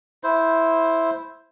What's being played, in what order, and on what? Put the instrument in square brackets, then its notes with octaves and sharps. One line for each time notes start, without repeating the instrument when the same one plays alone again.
[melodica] E4 C5